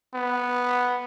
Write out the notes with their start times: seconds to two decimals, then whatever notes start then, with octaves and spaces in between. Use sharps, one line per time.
0.14 B3